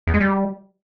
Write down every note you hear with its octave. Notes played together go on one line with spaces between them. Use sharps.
E2
G#3
G3